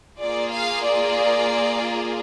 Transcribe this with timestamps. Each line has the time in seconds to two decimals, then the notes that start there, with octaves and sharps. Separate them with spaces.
0.19 A#3 F4 G#4 D5
0.53 F5
0.84 D5